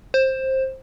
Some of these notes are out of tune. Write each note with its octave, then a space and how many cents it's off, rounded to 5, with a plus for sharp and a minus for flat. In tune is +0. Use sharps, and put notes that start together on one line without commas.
C5 +15